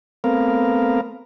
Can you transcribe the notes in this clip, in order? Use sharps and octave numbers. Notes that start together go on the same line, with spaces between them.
A3 B3 C4 A#4 F5